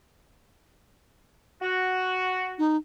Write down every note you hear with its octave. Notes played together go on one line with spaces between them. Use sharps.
F#4
D#4